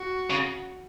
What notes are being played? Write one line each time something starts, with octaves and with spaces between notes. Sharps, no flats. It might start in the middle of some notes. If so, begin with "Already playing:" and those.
Already playing: F#4
C#3